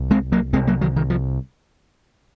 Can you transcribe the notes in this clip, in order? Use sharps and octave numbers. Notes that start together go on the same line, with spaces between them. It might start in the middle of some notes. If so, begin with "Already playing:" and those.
Already playing: C2
G#3 C4
F#3 A#3
C2 C3 G#3 C4
F#3 A#3
D#3 F#3
D#3
F3